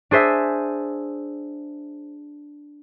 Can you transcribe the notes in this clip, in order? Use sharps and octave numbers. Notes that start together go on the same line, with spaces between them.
D4 G#4 C5 E5